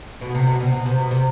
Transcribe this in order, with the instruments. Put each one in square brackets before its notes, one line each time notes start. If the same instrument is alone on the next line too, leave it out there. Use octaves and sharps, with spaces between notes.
[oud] B2
C3
B2
C3
B2
C3
B2
C3